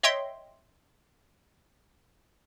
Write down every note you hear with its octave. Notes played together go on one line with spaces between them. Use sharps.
C#5 D#5 E5 G5 C6